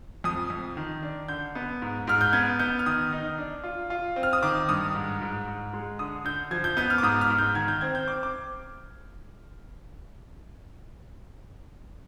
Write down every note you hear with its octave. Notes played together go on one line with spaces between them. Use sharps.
F2 D#6
F2
D#3
D4
D3 G6
B3
G#2
G#2 F6
G6
B3 G#6
B3 G6
F6
D#3 D#6
D#4
D4
F4
F4
C4
F6
D#6
D#3 D6
G2 D#6
G#2
G#2
G#2
G#3
D3 D#6
D3 G6
F3 G#6
G6
B3 G6
F6
D6
G#2 D#6
F6
G#2
G6
D#3 G#6
G6
C4 G#6
G6
C4 D6
D6